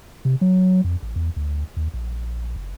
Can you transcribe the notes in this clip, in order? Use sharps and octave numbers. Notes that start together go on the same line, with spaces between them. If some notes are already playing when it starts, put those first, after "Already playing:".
C3
F#3
F2
A1
E2
D2
D#2
A#1
F#1